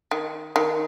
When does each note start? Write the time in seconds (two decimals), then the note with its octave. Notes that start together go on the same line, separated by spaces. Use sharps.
0.11 D#3
0.56 D#3